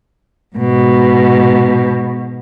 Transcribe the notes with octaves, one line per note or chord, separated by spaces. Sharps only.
G#2 B2